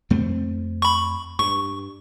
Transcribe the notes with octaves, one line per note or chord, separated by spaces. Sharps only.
F2 A3 C4
B5 C#6
G2 C#6